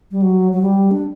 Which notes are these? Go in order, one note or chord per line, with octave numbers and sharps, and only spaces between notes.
G3
F#3
F#3
G3
D4